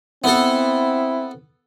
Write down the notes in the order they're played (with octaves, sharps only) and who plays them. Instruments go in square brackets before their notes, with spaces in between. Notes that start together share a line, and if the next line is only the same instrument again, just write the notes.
[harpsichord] B3 A4 [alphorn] C4 [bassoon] E4